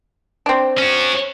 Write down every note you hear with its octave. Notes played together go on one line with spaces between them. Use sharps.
C4 D4
C#4 F#4